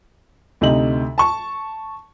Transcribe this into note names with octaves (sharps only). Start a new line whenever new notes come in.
D2 C3 D#4 F#7
A5 C#6